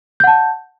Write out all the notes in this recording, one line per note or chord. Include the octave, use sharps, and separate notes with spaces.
F#5 A5 G6